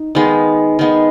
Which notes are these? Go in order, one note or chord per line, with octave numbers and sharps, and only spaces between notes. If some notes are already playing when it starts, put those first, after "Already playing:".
Already playing: D#4
D#3 G#3 B3
D#3 G#3 B3